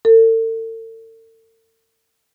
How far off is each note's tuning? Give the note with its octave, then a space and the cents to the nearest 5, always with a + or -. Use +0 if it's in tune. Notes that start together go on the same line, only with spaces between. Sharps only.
A4 +40